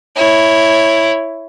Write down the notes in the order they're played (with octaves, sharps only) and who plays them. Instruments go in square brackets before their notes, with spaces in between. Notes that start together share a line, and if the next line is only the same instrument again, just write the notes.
[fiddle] E4 C#5